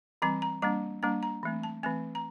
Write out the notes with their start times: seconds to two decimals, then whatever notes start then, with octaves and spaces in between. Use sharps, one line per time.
0.22 E3 G3 C4 A#5
0.42 A#5
0.62 G3 A#3 D4 A#5
1.03 G3 A#3 D4 A#5
1.23 A#5
1.43 E3 A3 C4
1.63 A5
1.83 E3 A3 C4 G#5
2.15 A#5